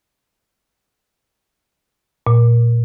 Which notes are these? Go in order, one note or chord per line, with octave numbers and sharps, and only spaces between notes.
A#2